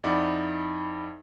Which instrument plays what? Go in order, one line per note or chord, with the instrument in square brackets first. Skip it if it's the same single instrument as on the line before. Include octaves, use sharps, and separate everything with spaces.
[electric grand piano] F2 D#4 E4 D5 F#5